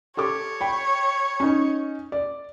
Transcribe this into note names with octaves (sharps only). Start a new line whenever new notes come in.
G4 A4 C#5 D6
G5 B5
C#4 D#4
D5